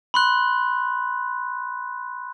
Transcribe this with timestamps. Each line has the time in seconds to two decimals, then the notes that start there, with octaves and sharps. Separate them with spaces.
0.14 B5 C6 F#6